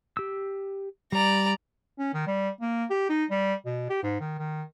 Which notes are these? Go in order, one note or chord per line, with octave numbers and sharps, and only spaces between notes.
G4 E6
G3 D5 A#5
C#4
D#3
G3
A#3
G4
D#4
G3
B2
G4
G#2
D#3
D#3